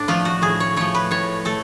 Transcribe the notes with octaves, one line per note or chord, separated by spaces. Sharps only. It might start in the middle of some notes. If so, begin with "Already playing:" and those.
Already playing: A2 D4
F3 A3 F4
F#4
A2 G#4
C#5
F3 A3 C#5
B4
A2 C#5
A3 A4